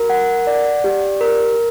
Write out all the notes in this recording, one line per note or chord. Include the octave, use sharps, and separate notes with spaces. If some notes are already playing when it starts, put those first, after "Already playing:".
Already playing: F#4 A#4
F#5
D5
G4
A#4